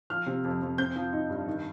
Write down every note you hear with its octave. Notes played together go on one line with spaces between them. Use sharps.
F3 F6
C3
F2
F2
C4 G6
F3
D#4
G2
D#3